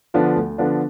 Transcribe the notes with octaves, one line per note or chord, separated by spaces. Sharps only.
D3 F3 B3 D4
D2
D3 F3 B3 D4